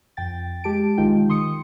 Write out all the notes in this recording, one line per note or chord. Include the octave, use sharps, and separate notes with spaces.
F2 G5 A6
G#3 G4 A5 D7
B1 D#3 G#3 D#4 F4 G5
D#3 C6 D#6 C#7